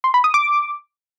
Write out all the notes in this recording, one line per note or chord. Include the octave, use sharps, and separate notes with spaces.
C6
B5
D#6
D6